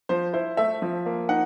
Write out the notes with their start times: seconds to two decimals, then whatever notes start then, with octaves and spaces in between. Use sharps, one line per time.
0.09 F3 C5
0.33 E4 C5
0.57 A3 E5
0.82 F3
1.06 A#3
1.29 D#4 F#5